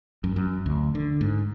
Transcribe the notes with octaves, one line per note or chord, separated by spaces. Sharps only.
F#2
F#2
D2
D3
G#2